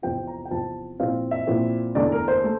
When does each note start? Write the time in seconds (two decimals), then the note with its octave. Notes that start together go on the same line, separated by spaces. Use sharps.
0.02 E2 C3 F3 C4 F4 G5
0.27 A#5
0.45 G5
0.51 E2 C3 F3 C4 F4 A5
0.99 A#2 F3 C4 E4 F5
1.31 E5
1.47 A#2 F3 C4 E4
1.95 E2 D3 A3 D4 D5
2.12 A#4
2.28 C5
2.44 A3